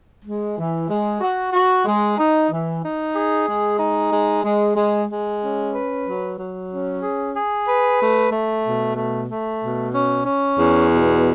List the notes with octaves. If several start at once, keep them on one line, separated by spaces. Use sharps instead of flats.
G#3
E3
G#3
F#4
F#4
G#3
D#4
E3
D#4
G#4
G#3
D#4
G#3
G#3
G#3
G#3
C#4
B4
F#3
F#3
C#4
G#4
G#4
B4
A3
A3
B2
A3
A3
B2
C#4
C#4
E2
B2